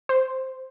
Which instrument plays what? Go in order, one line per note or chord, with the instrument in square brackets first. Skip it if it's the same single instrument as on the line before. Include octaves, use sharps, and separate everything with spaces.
[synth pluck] C5